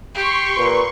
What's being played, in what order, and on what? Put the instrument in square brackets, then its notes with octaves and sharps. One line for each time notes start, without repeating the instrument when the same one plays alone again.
[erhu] G4 [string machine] C6 C#6
[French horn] A#2 [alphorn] B4